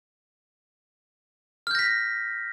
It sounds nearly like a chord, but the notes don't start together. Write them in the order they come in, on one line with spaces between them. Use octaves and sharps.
F6 G6 A#6 B6